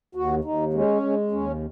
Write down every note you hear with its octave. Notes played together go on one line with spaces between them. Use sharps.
D#2 F#4
D#2 D#4
G#3 C#4
G#3
D#2 C#4